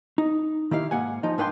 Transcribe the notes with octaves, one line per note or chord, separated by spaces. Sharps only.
D#4
D#3 E4 G4 F5
G#2 A#3 F#5 G#5
F3 D#4
G#2 D4 B4 F5 G5 C6